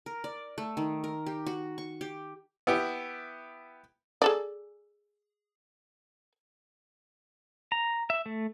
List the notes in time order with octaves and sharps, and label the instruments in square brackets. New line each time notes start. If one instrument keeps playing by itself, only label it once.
[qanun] A#4
D5
A3
D#3
A#4
G4
F#4
C#6
G4
[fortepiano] B3 E4 G4
[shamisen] G#4 A4 D5
[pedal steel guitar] A#5
E5
A3